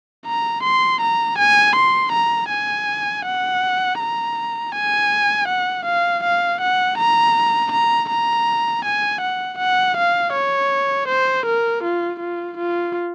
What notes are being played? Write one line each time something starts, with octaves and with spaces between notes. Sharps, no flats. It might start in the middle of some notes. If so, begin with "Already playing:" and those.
A#5
C6
A#5
G#5
C6
A#5
G#5
F#5
A#5
G#5
F#5
F5
F5
F#5
A#5
A#5
A#5
G#5
F#5
F#5
F5
C#5
C5
A#4
F4
F4
F4